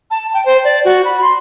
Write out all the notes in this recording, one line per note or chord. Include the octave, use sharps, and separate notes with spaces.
A5
G5
C5
D5
F#4
B5
C6